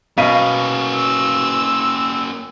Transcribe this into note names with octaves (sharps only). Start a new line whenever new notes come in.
B2 A#3 C#4 F5 B6 D#7
E6